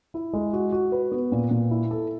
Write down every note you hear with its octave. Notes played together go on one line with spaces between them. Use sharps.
E4
G#3
F#4
F#4
B4
B3
A#2
A#2
E4
A4